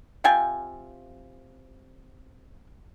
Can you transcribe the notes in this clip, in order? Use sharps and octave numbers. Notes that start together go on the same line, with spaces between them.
C3 F4 G5 G#5